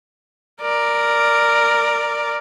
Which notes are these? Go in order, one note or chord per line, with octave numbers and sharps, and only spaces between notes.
A#4 D5